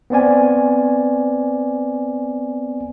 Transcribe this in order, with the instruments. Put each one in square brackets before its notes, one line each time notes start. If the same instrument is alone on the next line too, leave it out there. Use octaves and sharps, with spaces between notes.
[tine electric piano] B3 C4 D5 G#5